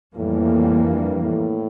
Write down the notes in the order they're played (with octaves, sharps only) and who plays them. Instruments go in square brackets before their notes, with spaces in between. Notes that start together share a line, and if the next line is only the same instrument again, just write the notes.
[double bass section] F2 E3 G3 A#3 [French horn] A2
[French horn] G2
A2